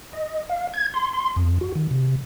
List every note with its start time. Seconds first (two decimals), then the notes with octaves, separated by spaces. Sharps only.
0.13 D#5
0.49 F5
0.74 G#6
0.94 C6
1.13 C6
1.36 F2
1.61 F#4
1.75 D#3
1.91 C3